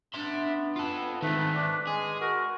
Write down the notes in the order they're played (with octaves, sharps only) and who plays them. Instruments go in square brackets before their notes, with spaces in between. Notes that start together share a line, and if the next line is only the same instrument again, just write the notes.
[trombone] B3 [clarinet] D4 [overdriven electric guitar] E5 C6
[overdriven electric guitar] F4 A4
[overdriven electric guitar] D#3 C4 [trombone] A3 [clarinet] B4
[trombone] D4
[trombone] G#3 [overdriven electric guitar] G#4
[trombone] F#4 [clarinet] A#4